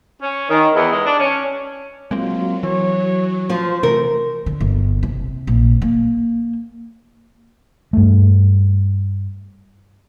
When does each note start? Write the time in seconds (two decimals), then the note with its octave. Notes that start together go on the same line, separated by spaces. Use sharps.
0.21 C#4
0.50 D#3
0.74 E2
0.92 G#3
1.06 D4
1.19 C#4
2.11 F#3 G#3 A#3 C4 F4
2.63 E3 C#5
3.50 F3 F4 C5
3.83 C3 E3 A3 A#4
4.46 D3
4.60 G1
5.03 C3
5.47 A#1
5.82 A#3
7.93 G2 A3